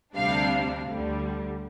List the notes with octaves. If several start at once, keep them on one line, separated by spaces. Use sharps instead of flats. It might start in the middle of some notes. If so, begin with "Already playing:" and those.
D2 C3 G3 D4 F5
D2 D3 G3